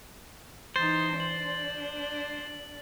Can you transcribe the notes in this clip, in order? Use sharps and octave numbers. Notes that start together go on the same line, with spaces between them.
E3 D#4 C5 A6
D4 F#7